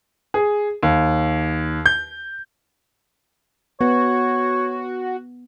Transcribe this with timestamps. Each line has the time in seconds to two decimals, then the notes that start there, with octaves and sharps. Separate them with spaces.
0.34 G#4
0.83 D#2
1.86 G6
3.81 B3 F#4 C#5